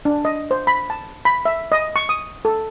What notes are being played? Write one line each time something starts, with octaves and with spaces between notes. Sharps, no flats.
D4
D#5
C5
B5
A5
B5
E5
D#5
C#6
D#6
A4